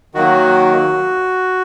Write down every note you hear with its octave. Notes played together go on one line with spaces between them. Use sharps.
D#3 F#3 A#3 F#4